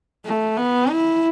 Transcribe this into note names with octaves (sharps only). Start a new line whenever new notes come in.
A3
B3
E4